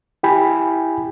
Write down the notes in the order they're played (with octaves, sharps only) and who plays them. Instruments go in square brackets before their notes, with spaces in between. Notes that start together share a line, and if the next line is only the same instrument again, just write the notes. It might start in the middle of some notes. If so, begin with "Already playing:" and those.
[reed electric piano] E4 G4 G5 G#5 B5